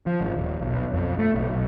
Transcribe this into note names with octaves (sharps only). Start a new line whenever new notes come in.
F3
G#1
D#1
B1
F2
A3
B1
B1